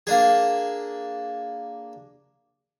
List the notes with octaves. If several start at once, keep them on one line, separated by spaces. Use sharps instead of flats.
A#3 D4 G#4